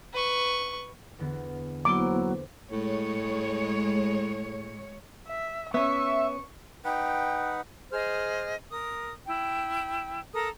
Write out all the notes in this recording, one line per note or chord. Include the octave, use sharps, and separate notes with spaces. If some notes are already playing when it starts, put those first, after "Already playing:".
B4 C#6
E2 D3 B3
F#3 A#3 B3 E4 A4 C5 D6
A2 G#3 C#5
E5
B3 C#4 E5 C#6
D#4 B4 F#5 G5
G#4 C5 D#5 F6
A#4 D#6
E4 G5
A4 A#4 A#5 D#6